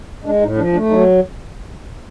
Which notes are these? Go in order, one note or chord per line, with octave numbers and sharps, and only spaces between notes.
G#3 D4
A2 D#4
F3 D4
A3 D4
F#3 D#4